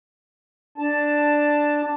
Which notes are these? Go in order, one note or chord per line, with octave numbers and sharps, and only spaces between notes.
D4 A5